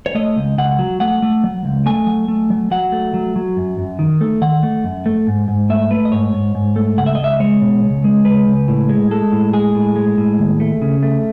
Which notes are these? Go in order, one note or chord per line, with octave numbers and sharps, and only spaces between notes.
C#5
A3 D#5
C#2
C#2 F#5
F#3
A3 F#5
A3
F#3
C#2
A3 G#5
F#3
A3
F#3
F#3 F#5
A3
F#3
F#3
F#2
F#2
D#3
A3
D#3 F#5
A3
F#2
A3
G#2
G#2
A3 E5
A3 B4
D#5
G#2 C#5
G#2
G#2
A3
C#2 F#5
E5
D#5
C#2
E5
G#3 C#5
B2
C#2
G#3
C#2 B4
C#2
A2
G#3
G#3 A4
A2
G#3 G#4
A2
G#3
A2
D#2
A3
C#3
A3